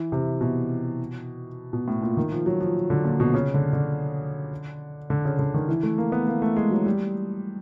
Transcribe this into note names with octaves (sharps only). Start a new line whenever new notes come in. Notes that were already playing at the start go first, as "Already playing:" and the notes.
Already playing: E3
C3
B2
B2
A2
A#2
D#3
F3
F#3
F3
D3
A#2
B2
C#3
D3
D3
D3
C#3
D3
D#3
E3
A3
A#3
B3
A#3
A3
G#3
F#3
G3